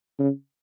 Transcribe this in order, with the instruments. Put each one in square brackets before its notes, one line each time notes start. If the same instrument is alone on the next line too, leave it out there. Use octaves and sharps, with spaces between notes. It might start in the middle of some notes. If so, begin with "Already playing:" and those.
[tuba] C#3